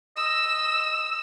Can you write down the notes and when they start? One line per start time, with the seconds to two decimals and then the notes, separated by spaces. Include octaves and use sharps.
0.17 D#5 E6